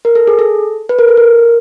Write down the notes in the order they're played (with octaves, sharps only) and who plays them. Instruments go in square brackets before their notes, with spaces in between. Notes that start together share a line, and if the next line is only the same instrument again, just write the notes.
[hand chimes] A#4
A4
G#4
A4
B4
A#4
A4
A#4